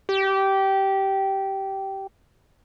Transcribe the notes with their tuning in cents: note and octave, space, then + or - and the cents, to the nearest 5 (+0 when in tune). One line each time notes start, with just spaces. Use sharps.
G4 -15